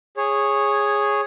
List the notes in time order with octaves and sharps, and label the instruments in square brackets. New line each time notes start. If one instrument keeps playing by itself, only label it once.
[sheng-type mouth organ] G#4 C#5